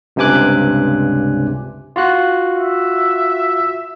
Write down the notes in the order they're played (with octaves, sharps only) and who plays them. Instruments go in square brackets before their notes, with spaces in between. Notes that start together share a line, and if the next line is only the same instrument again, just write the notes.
[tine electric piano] C#2 G2 C3 G#5 D6 F#6
F4 F#4 F#6
[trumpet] E5